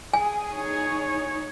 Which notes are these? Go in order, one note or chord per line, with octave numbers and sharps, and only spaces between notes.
G#4 G#5
D#4 C#5